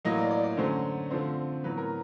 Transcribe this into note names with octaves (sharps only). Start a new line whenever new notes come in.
A2 F#3 A#3 D#5
D5
D5
D5
D3 F#3 A3 C#4 C5
D3 F3 A3 C4
A2 F#3 B3 B4
A#4